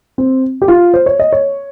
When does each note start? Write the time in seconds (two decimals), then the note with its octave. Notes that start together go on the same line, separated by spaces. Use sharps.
0.18 C4
0.62 G4
0.68 F4
0.94 C5
1.06 C#5
1.19 D#5
1.32 C#5